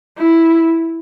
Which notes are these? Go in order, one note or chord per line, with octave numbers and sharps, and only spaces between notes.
E4